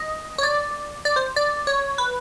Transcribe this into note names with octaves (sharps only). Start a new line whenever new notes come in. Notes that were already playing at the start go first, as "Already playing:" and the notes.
Already playing: D#5
C#5
D5
D5
C5
D5
C#5
B4